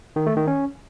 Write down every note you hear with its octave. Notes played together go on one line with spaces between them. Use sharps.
D#3
A3
D#3
C#4